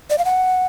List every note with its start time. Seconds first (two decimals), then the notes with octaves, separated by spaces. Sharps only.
0.10 D5
0.18 F5
0.25 F#5